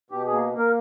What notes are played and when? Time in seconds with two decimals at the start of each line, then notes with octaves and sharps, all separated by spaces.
0.10 B2 G4
0.27 G#4
0.32 A#3
0.53 A#3
0.58 A#4